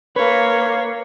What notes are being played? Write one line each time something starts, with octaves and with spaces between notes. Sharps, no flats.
A#3 B4 C#5